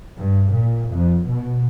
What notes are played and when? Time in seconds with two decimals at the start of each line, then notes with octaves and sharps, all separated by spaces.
0.18 G2
0.53 A#2
0.91 F2
1.27 B2